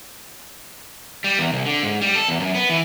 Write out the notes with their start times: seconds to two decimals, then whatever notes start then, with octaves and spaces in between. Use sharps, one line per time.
1.24 G3
1.39 E2
1.53 C2
1.66 D3
1.83 G#2
2.01 G3
2.15 A4
2.28 E2
2.40 F#2
2.55 B3
2.70 E3